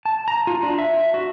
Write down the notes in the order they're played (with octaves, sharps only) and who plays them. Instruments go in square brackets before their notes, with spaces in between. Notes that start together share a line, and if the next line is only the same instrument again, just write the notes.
[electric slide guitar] A5
A#5
F4
D4
E5
F#4